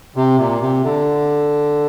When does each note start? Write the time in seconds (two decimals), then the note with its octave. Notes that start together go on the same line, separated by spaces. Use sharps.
0.16 C3
0.38 A#2
0.61 C3
0.84 D3